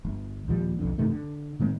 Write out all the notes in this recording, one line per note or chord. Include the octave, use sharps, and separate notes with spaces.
G1
D#2 A#2 F3 G3
B1 F2 D3
G2 C3 D#3 A3
D3
A2 D#3 G#3 C4